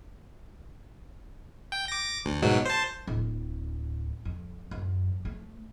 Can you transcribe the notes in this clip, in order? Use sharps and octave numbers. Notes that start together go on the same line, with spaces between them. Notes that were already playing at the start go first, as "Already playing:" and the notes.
G5
D6 A#6
D2
G#2 B2 F#3
C5 A5
D1
F2
F#2
A3